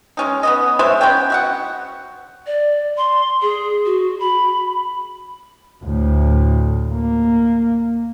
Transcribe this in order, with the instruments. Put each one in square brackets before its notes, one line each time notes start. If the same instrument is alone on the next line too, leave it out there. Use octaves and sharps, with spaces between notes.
[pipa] G#3 C#4 D#4
B3 C#4 D#5
G#3 C5 C#5 E5
B3 C#4 C#5 G5
F#4 E5 F#5
[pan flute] D5
C6
G#4
F#4
B5
[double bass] D2 A2
A#3